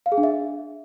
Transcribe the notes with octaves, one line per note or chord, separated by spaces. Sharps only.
F5
G#4
D4
E5